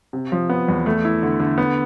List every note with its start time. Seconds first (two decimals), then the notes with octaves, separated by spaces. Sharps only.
0.13 C3
0.32 F3
0.50 B3
0.68 E2
0.86 A3
1.05 E4
1.23 D3
1.40 D3
1.58 B3